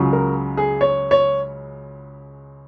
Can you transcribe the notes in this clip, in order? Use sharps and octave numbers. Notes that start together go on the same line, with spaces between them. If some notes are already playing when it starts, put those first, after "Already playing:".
Already playing: C#2 C#3 F#3
A#4
G#4
C#5
C#5